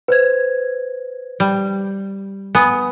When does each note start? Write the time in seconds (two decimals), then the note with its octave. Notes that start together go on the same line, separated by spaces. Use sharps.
0.08 B4 C5 G#6
1.40 G3
2.55 B3 G#5 D#6